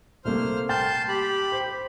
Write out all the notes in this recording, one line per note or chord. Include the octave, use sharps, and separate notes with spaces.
C2 A3 A#3 C5 F6
G5 A5 C6 F6 G6 A6
G4 B5
C5